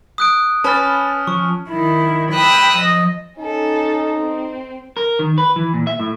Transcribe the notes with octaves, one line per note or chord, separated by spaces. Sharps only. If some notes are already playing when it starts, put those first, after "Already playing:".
D#6 F#6 D7
C#4 B4 A5 B5 F6 A6
F3 C#6
D#3 E4
G5 B5 D#6 E6 F#6
F3 D#5
C#4 D#4 A4
C4
A#4
D#3
B4
E3
A#2
E5
A2